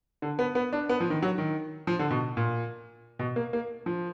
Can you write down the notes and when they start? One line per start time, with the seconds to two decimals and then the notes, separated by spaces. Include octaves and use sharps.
0.22 D3
0.39 B3
0.55 B3
0.73 D4
0.89 B3
1.00 F3
1.10 D#3
1.22 F#3
1.38 D#3
1.87 F3
1.99 D3
2.10 B2
2.37 A#2
3.19 B2
3.36 A#3
3.53 A#3
3.86 F3